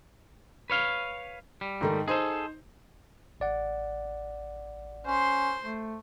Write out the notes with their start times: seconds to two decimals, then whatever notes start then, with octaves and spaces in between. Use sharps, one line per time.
0.70 B4 C#5 F5
1.61 G3
1.81 G#2 D#3 A3
2.08 D#4 G#4 A4 C5
3.40 A1 D5 F#5
5.07 C#4 C5 C6
5.64 A3